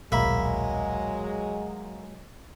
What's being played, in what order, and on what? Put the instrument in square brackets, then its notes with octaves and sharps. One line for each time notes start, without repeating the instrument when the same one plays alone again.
[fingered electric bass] D#1 B1 [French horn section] F#3 G#3 [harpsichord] A#3 [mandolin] E5 B5